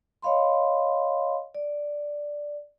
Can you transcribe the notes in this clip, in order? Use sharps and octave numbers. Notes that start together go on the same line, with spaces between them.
C#5 D#5 F5 B5 C6
D5